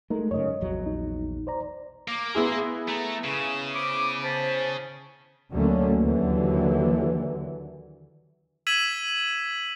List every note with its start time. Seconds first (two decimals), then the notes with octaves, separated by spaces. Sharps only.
0.10 G#3 A3 D#4 A#4
0.31 F#2 C#3 C#5 D#5
0.61 A#1 E2 F#3
0.86 D#4
1.47 C5 D5 A#5
2.08 A#3 D6
2.35 B3 E4 G#4 C6
2.88 A3 A#5
3.24 C#3 E7
3.74 C5 B5 D6 D7
4.23 C5 A5 B6
5.52 D2 D3 F#3 A3 A#3 C#4
6.00 D#2 D3 E3 F#3
8.67 E6 G#6 B6 D#7 E7 F#7